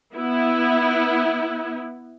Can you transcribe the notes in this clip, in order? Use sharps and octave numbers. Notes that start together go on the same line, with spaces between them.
B3 E4